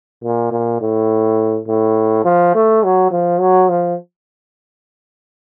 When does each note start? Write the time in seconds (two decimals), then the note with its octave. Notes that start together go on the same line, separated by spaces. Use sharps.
0.24 A#2
0.52 A#2
0.81 A2
1.68 A2
2.25 F3
2.55 A3
2.84 F#3
3.11 F3
3.40 F#3
3.69 F3